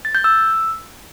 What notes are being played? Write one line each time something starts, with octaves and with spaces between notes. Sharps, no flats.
A6
G6
E6